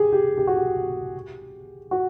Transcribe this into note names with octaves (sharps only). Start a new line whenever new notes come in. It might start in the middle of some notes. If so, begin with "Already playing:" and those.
Already playing: G4 G#4
G4
G4
F#4
G4
F#4